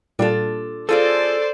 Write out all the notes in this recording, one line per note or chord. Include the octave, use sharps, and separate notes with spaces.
A#2 G3 D4 F4 A4
C4 F4 G#4 A4 C5 D5